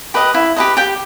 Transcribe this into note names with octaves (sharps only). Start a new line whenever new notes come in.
G4 B4 D#5
E4
G4 B4 D#5
G4 G5